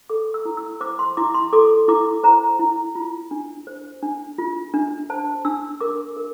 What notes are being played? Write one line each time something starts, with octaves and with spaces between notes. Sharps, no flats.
A4 D6
E6
E4
E6
C5 D6
C6
E4 D6
C6
A4 D6
E4 D6
C5 A#5
E4
F4
D4
C5
D4
F4
D4
C5 A5
D4 E6
A#4 D6
A#4